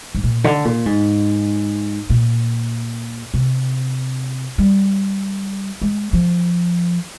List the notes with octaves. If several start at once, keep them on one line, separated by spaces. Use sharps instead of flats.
G#2
A#2
D3
A#2
G#2
A#2
C3
G3
G#3
F3